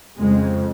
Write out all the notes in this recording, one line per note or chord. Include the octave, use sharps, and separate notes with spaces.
F2 C#3 G#3